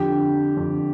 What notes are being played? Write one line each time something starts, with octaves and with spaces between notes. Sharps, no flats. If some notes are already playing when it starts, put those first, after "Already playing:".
Already playing: F2 D3 G4
F2 D3